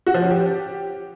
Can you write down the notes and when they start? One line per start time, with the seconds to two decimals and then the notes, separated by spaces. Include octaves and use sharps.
0.07 F#4
0.14 F3
0.22 C#4
0.30 G4